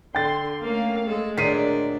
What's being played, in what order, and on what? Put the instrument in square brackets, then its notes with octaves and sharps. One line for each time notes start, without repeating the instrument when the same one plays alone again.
[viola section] D3 C6 [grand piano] G5 A6
[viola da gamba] A3 C#4 [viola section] A#3 F5
[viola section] G#3 [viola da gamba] A4
[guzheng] A#2 D#3 F#3 [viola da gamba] D4 [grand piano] B6 C7 D#7